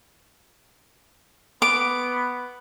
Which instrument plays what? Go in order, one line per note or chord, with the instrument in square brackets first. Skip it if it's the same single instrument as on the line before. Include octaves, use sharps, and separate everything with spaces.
[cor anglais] B3 [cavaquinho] D6